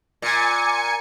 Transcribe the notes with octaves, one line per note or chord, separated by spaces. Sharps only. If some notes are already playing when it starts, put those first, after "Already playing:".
A#2 G#5 C#7